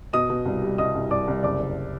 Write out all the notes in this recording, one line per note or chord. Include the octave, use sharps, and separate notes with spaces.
B2 D#5 D#6
B2
C2
G3
C2 D#5 D#6
C2
C2 D5 D6
C2
F#1 D5 D6
F#1